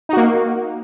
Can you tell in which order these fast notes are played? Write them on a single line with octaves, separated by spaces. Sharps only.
D#4 F#4 A#3